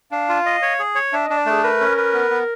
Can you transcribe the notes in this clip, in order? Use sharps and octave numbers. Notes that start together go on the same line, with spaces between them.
D4 F5
F4
D#5
C#5
G#4
C#5
D4 E5
D#5
D4
D5
A3 G#4
A#4 B4
C#4
B4
B3
B3